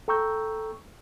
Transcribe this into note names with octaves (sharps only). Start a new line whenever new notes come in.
A4 G5 A#5 C#6 E6 G6